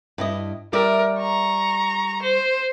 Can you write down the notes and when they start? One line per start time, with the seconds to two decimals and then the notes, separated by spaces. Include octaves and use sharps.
0.18 G2 E4 D#5
0.73 G3 A#4 D5 E5
1.19 A#5 C#6
2.22 C5